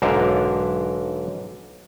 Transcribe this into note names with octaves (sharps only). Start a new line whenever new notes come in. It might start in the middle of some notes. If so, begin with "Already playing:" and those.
B1 G#2 D3 A#4 E5 F5